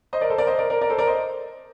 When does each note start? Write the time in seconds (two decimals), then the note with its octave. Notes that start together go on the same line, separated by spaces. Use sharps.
0.13 C5 D#5
0.21 A#4 D5
0.30 A4 C5
0.38 A#4 D5
0.47 C5 D#5
0.58 A#4 D5
0.70 A#4 D5
0.81 A#4 D5
0.90 A4 C5
0.98 A#4 D5
1.07 C5 D#5